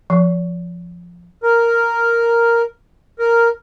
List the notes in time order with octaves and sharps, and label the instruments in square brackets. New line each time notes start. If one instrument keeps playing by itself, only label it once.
[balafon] F3
[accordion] A#4
A#4